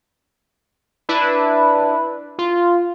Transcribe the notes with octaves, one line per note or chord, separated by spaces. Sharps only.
D4 E4 B4
F4